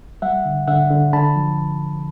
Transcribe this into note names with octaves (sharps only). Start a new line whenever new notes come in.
G3 E5 F#5
D3
D3 E5 F#5
D3
D3 A5 B5
F3